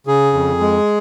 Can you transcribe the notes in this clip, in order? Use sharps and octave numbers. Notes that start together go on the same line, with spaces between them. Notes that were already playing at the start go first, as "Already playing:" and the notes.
C#3 G#4
F2
G#3